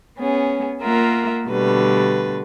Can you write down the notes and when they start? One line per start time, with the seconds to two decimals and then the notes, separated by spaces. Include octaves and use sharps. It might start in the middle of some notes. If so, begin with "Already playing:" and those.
0.18 B3 C#4 G#4
0.81 A#3 F4 A#4 E5 F#5
1.48 B2 D3 G3 A3 B4